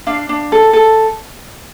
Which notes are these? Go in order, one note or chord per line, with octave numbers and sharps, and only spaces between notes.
D4 F5
D4
A4
A4